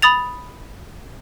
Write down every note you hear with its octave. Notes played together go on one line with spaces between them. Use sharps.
B5 D#6 A6 F7